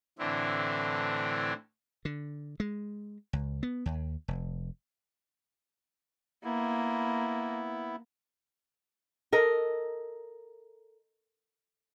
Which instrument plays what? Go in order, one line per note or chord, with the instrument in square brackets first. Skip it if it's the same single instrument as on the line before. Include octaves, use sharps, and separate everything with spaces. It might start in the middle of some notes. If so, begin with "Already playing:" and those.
[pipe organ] A2 D3 E3 C4 D4 E4
[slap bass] D3
G#3
C#2
B3
D#2
F1
[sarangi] A#3 [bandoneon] B3 E4
[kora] A4 A#4 D#5